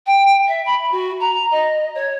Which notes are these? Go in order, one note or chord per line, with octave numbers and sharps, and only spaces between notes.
G5
E5
B5
F#4
A#5
D#5
C#5